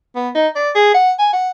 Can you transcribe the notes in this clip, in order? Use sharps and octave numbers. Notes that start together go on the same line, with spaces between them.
B3
D#4
D5
G#4
F#5
G#5
F#5